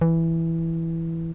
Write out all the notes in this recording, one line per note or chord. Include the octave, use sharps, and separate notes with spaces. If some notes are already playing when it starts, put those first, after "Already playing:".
E3